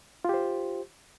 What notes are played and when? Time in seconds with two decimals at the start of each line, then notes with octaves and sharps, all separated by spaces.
0.25 F4
0.29 G4
0.34 C5